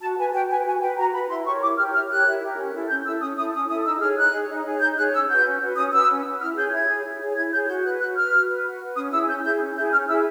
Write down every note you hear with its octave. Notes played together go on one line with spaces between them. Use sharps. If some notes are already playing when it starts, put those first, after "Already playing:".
F#4 A5
B4 G#5
F#4 G5
B4 G#5
F#4 G#5
B4 G5
F#4 A#5
B4 B5
E4 C6
G4 A#4 C#5 C#6
E4 D6
G4 A#4 C#5 F6
E4 F6
G4 A#4 C#5 F#6
E4
G4 A#4 C#5
C#4
E4 A4
C#4 G6
E4 A4 E6
C#4 D#6
E4 A4 D#6
C#4 D#6
E4 A4 D#6
D#4 E6
G#4 C#5 F6
D#4 F#6
G#4 C#5
D#4
G#4 C#5
D#4 G6
G#4 C#5 F#6
C#4 E6
F#4 B4 G6
C#4
F#4 B4
C#4 D#6
F#4 B4 E6
C#4
F#4 B4
E4 F6
G#4 C#5 G6
E4 G#6
G#4 C#5
E4
G#4 C#5
E4 G#6
G#4 C#5 G6
F#4 G6
B4 F#6
F#4 F#6
B4 F6
F#4
B4
F#4
B4
C#4 D#6
E4 G#4 E6
C#4 G6
E4 G#4 G6
C#4
E4 G#4 G6
C#4 F6
E4 G#4 E6